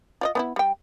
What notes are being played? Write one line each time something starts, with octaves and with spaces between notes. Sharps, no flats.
F4 D5 D#5
B3 D#4 E4
G3 G5